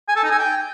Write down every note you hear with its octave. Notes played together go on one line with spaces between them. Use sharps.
G#5
A4
D#4
G#5
G5